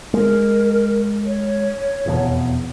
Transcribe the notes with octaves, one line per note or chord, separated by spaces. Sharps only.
G#3 A#4
C#5
F1 E2 B2